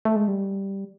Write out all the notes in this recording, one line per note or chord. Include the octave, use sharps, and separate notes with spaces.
A3
G#3
G3